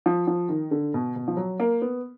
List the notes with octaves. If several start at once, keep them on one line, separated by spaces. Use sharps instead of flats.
F3
F3
D#3
D3
B2
B2
F3
F#3
A#3
B3